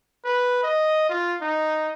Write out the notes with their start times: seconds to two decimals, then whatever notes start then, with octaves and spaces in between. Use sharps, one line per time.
0.24 B4
0.63 D#5
1.10 F4
1.41 D#4